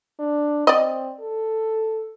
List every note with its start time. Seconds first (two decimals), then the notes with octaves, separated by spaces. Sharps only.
0.19 D4
0.67 C4 D5 D#5
1.20 A4